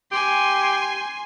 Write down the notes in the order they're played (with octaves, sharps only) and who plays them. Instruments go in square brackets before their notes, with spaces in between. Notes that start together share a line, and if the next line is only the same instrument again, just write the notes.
[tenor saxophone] G4 [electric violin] G#5 C6